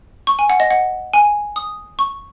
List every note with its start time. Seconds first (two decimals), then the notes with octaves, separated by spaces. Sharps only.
0.27 C#6
0.39 G#5
0.50 F#5
0.60 D#5
0.71 F#5
1.14 G#5
1.56 D#6
1.99 C#6